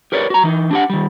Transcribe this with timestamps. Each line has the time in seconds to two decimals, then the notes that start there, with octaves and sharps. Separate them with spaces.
0.12 G4 A#4 B4 C#5 D5
0.30 F#4 A#5
0.44 E3 D#4
0.71 D4 G4 F#5
0.90 D#3 G3